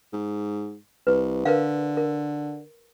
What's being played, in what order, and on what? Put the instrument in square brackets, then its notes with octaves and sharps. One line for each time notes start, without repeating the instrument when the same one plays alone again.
[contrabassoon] G#2
[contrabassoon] C2 [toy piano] B4
[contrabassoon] D3 [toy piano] A#4 B4 F5
[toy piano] A#4